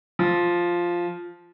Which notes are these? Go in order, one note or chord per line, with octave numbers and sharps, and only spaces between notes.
F3